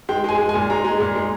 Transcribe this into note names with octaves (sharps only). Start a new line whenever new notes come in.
G#3 G5
G#3 G#5
G#3
A#2 G#5
G#3 A#5
G#3
A#2
G#3